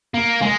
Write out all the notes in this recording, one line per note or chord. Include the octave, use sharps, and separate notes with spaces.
A#3
G#3